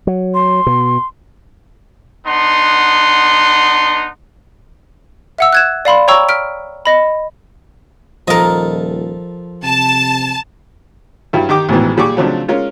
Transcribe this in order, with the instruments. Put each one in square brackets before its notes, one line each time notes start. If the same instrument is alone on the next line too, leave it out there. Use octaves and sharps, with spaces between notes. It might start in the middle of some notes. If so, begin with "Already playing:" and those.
[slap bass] F#3
[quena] C6
[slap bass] B2
[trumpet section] B3 D4 D#4 F#5 C6
[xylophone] E5 F#5 E6
F#6 G#6 E7
D5 F5 B5 C6
C#5 G5 A#5 C#6 E6
F6 B6 D7
D#5 B5
[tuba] D#1 [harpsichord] F3 A4 [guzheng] A#4 D#5
[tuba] C3 [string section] A5
[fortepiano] G2 F#3 E4
D#3 D#4 G4 D6
A1 E2 G#2 B2 D#3 E3
A#2 G3 G#4 C#6 D6
C#3 F3 F#3 A3 C4 D4
G#3 C#4 F4 A#4